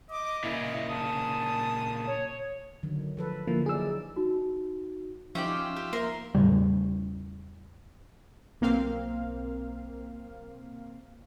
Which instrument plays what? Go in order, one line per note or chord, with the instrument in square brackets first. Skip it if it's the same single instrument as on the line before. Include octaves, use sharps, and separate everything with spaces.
[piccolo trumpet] D#5 [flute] D6
[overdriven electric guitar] A#2 C#3 [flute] E4
[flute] A5 [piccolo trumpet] D#6
[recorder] C#5
[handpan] D3 D#3 F#3
F3 A4 B4
[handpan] D3 E4 [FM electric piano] F3 A#3
[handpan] F#3 D#4 D5 [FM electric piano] G#4 E6
[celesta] D#4 F#4
[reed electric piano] F3 D#4 [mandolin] C#4 G4 D5 [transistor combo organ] F4 E5
[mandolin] G4
[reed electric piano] A#3 [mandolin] A#4 C6
[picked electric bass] E2 A2 C#3 G3
[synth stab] B1 A#3 C4 F5